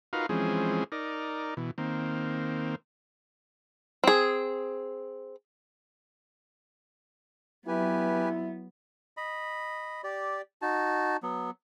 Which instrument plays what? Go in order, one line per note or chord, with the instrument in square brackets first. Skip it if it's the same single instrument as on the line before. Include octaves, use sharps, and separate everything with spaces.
[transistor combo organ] D#4 F4 F#4 A#4 B4 F5
E3 F3 G#3 C4 C#4 G#4
D#4 A#4 D5
B2 E3
D#3 A#3 C4
[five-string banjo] C4 G#4
[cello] F#3 B3 [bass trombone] E4 [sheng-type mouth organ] G4 B4 G#5 [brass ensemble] E5
[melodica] D#5 B5
G4 D5
D#4 F#4 A5
F#3 B3